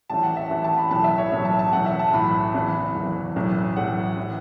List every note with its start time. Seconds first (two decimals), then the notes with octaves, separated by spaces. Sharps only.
0.09 A1 A2 E3 A5
0.23 F#5
0.37 E5
0.51 A1 A2 E3
0.64 A5
0.78 B5
0.91 B1 A2 E3 A5
1.04 E5
1.18 C#5
1.32 B1 A2 E3 E5
1.45 A5
1.59 A5
1.72 B1 A2 E3 F#5
1.86 E5
1.99 A5
2.13 B1 A2 E3 B5
2.54 F#1 E2 E3
2.95 F#1 E2 E3
3.36 B1 A2 E3
3.76 B1 A2 E3 F#5
4.17 A2 E3